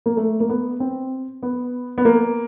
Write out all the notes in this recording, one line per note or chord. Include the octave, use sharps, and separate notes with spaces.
A#3
A3
A#3
B3
C4
B3
B3
A#3